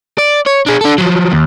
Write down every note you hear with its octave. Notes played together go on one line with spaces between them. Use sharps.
D5
C#5
D4 G#4
D4 A4
F3 F#3
D#2